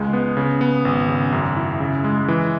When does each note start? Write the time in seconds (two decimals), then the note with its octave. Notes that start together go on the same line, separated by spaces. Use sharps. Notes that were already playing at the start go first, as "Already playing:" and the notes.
Already playing: C#2 G#3
0.13 B3
0.37 C#3
0.61 B3
0.85 G#1
1.09 C#3
1.32 F#2
1.56 E4
1.80 C#3
2.04 G#3
2.28 E3